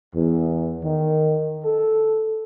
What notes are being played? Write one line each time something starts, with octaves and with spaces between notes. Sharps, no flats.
E2
D#3
A4